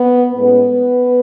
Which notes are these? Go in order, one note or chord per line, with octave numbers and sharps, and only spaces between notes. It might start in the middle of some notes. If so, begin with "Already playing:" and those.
Already playing: B3 B4
A2 G#3 B3 C#4 B4